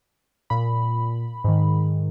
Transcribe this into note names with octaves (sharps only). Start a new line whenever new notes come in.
A#2 B5
G#2 D#3